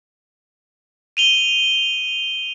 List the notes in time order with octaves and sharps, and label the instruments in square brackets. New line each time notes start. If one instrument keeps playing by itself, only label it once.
[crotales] D#7 F7 G7